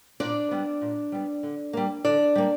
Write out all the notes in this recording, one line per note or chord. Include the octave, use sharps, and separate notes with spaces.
A#2 D4 D5
G3 B3
A#2
G3 B3
D3
G3 A#3
D3 D4 D5
G3 A#3